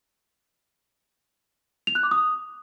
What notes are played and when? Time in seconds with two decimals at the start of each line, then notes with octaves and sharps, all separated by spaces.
1.87 F7
1.95 F#6
2.03 D6
2.11 D#6